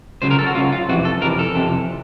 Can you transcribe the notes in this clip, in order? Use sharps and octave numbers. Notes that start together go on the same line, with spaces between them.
C#2 C#3 F#3 C5
A#4
A4
F#4
C#2 C#3 F#3 F4
F4
F2 C3 E3 F#4
A4
F2 C3 E3 A#4
A4
F2 C3 E3